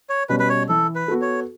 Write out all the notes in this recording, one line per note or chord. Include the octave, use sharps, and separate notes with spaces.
C#5
B2 G3 C#4 B4
B4
C#5
E3 A4
B4
B3 F#4 A4
C#5